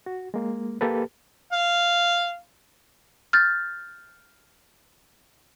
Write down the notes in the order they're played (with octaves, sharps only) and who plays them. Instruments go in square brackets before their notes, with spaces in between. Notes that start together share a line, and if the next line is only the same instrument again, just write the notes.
[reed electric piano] F#4
G#3 A#3
A#3 G4 A4 B4
[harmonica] F5
[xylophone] F6 G6 A6